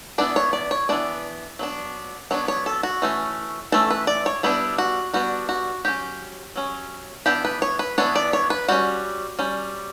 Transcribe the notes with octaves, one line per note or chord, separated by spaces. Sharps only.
E3 B3 D4 D5
C#5
D5
C#5
E3 B3 D4 D5
F#3 B3 D4
F#3 B3 D4 C#5
C#5
A4
F#4
E3 A3 C#4
E3 A3 C#4 A4
B4
D5
C#5
G3 B3 D4 E4
F#4
G3 B3 D4 F#4
F#4
F#3 C#4 G4
F#3 C#4
E3 B3 D4 G4
B4
C#5
B4
E3 B3 D4 C#5
D5
C#5
B4
G3 C#4 F#4
G3 C#4